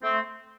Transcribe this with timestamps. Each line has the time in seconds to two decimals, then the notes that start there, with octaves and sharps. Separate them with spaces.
0.03 A3 C4